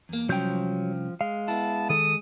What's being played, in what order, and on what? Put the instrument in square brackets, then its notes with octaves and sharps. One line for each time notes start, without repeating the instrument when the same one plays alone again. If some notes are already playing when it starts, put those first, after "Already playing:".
[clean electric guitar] E2 A#3
[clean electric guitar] C2 C#4 G5 [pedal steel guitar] F3 G6 [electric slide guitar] F#3
[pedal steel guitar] G#3 [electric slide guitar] F5
[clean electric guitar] B3 E4 [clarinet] A5
[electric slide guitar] D#3 A4 [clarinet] D#6